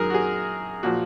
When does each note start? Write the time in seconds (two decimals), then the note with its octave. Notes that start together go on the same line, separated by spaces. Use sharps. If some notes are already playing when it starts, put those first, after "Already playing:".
Already playing: F#2 D#3 F#3 G#4 A#4
0.10 F#4
0.14 G#4
0.83 A#2 F3 F#4